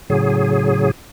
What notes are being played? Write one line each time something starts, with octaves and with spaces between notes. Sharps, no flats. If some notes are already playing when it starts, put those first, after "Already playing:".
A2 C#3 F#3 G#4